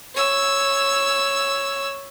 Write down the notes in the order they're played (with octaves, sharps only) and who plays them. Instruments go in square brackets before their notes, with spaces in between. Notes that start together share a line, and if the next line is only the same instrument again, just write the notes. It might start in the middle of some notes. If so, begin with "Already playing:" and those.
[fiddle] C#5 E6